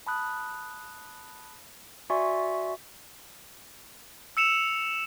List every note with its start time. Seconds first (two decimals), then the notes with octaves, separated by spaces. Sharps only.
0.07 A5 B5 D#6 F#6
2.10 F#4 D5 E5 G#5 C6 C#6
4.37 E6 C#7 E7 F7